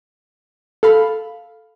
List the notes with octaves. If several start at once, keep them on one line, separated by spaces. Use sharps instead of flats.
A4 F5 B5